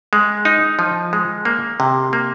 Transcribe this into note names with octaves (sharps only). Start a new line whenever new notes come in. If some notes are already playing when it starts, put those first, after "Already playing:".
G#3
D#4
F3
G#3
A#3
C3
A#3